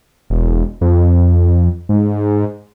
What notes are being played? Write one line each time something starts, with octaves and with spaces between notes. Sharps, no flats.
E1
F2
G#2